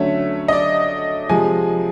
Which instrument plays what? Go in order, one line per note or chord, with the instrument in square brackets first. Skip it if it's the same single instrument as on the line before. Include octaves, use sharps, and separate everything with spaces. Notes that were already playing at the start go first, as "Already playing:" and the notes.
Already playing: [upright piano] D3 F#3 A3 C#4 E5
D#5
D5
C3 F3 G#3 G#5